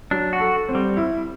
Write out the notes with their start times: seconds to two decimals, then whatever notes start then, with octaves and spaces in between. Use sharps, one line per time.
0.11 F#3 D4
0.33 F#4
0.40 A4
0.69 C4
0.75 G3
0.97 E4